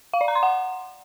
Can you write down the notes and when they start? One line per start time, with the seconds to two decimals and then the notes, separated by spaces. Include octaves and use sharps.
0.13 F5
0.21 D5
0.28 A#5
0.35 C6
0.43 F#5